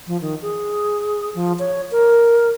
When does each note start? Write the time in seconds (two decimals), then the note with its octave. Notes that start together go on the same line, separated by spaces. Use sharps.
0.07 F3
0.21 D#3
0.42 G#4
1.34 F3
1.59 C#5
1.91 A#4